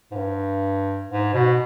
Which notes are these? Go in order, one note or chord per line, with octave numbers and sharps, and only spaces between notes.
G#2
G2
G#2
B2